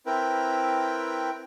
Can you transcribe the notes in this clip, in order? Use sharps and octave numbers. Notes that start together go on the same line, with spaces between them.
C4 E4 A#4 B4 G5